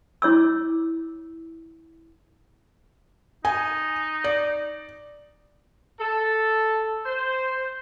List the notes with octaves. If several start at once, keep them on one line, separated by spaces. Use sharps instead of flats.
E4 C#5 D6 E6
D#4 G#5
D5
A4
C5